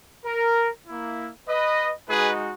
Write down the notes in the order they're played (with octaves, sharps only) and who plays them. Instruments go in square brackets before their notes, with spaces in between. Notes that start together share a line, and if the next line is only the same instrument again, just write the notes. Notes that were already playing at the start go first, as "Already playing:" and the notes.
[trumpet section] A#4
A#3 E4
B4 D#5
G#3 D#4 F#4 G#4 B4